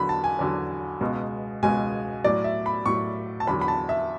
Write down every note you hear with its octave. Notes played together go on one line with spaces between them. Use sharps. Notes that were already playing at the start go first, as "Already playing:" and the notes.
Already playing: E2 D3 F#3 B5
A5
G#5
E2 D3 F#3
C#2 B2 G#3
C#2 B2 G#3 G#5
A2 F#3 D5
E5
B5
A2 F#3 C#6
A5
E2 D3 F#3 B5
B5
A5
E5